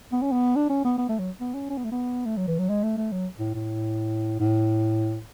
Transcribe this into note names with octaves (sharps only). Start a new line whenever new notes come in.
B3
C#4
B3
D4
C#4
B3
B3
A3
F#3
B3
C#4
C#4
B3
A3
B3
A3
F#3
E3
F#3
G#3
A3
A3
F#3
A2
A2
A2